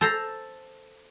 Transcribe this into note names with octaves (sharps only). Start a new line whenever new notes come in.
A4 C5 A#5